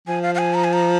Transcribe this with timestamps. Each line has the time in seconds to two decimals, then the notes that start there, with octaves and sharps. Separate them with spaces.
0.07 F3 G#5
0.23 F5
0.35 F5
0.38 G#5
0.54 A#5
0.64 G#5
0.73 A#5